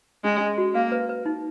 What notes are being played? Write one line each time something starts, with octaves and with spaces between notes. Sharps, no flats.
G#3 C#4
C#4
F#4
A#3 F5
B4
B4
D#4